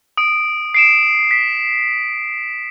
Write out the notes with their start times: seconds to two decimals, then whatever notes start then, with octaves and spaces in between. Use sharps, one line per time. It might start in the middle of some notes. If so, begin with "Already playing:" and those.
0.17 D#6 D7
0.74 C7 D7 E7
1.31 B6